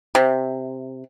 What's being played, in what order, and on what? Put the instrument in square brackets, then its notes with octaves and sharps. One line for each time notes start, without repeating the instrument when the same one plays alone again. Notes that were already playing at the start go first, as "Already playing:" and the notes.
[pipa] C3